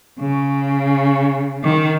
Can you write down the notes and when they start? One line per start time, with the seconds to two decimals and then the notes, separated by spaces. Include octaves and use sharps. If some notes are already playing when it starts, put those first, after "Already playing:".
0.20 C#3
1.63 D#3